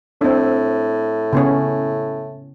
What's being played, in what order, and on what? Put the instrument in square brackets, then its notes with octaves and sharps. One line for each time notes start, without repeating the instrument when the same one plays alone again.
[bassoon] A2 [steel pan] C4 D4
[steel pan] C#3 B3 C#4